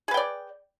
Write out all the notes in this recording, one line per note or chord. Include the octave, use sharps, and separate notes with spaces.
G#4 B4 D5 G5